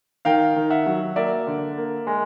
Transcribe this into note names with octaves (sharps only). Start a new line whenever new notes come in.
D#3 F5 G5
D#3
E5 F#5
F#3
A#3 D5 E5
D3
A#3
G#3